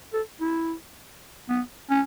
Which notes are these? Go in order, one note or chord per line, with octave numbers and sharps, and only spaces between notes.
A4
E4
B3
C#4